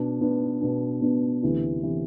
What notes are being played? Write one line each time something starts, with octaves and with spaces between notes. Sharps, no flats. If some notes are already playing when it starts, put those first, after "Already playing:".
Already playing: B2 B3 D4
B2 B3 D4
B2 B3 D4
B2 B3 D4
D2 C3 E3 B3 E4
C3 E3 B3 E4